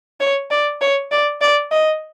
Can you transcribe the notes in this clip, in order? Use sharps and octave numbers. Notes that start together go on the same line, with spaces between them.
C#5
D5
C#5
D5
D5
D#5